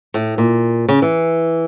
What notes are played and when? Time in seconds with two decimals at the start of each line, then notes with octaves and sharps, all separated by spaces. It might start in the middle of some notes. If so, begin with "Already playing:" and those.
0.14 A2
0.38 A#2
0.88 C#3
1.02 E3